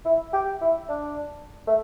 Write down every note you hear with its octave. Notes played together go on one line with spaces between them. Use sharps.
E4
G4
E4
D4
A3